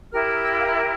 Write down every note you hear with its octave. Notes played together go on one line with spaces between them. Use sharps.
E4 G4 A#4 F6
E6
E6
G5
F5
E5